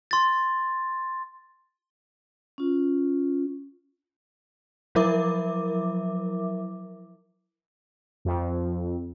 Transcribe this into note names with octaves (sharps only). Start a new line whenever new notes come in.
C6 A6
C#4 F4
F3 F#3 E4 A#4 E5 D6
F2